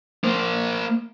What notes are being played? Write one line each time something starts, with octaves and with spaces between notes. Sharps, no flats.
A#3 C5